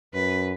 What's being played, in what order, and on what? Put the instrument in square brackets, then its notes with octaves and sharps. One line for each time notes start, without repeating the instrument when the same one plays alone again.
[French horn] F#2 [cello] B4